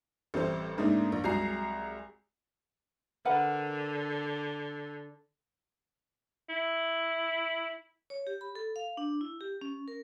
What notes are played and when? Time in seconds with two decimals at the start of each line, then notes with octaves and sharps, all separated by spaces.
0.34 A1 C3 G3 A4 C5
0.78 G#2 C#3 A3 A#3 D4 D#4
1.12 A#1
1.24 C2 F#3 G#3 G#4 A#5 C7
3.25 D3 A#4 B4 F#5
6.49 E4
8.10 C#5
8.27 G4
8.41 B5
8.55 A4
8.76 F5
8.97 D4
9.21 E4
9.41 G4
9.61 C#4
9.88 A#4